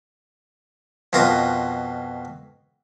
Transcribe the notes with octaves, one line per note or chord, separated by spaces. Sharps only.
F2 B2 F4 A#4 D#6